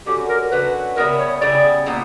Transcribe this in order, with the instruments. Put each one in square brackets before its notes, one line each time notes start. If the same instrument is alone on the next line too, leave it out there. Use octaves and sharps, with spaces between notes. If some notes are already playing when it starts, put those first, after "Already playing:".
[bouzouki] D3 F#3 C#4 F#4 [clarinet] G4
[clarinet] A#4
[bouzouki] D3 F#3 C#4 F#4 [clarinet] B4
[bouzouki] C#3 G3 B3 E4 [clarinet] A#4
[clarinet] C#5
[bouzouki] C#3 G3 B3 E4 [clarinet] D5
[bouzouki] A#2 G3 B3